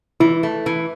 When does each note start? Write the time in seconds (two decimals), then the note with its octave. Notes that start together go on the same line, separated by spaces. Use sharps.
0.20 E3 E4
0.43 A3
0.66 E3